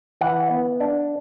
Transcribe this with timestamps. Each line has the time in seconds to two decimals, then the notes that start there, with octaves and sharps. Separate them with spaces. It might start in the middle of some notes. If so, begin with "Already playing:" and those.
0.21 E3 F#5
0.50 B3
0.80 D4